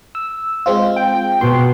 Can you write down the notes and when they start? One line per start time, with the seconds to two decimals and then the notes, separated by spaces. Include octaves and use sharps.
0.15 E6
0.66 G#3 C4 F4
0.96 G5
1.41 B2 C6